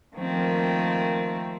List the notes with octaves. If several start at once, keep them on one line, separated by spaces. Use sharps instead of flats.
D#3 F3 A3 A#3 C4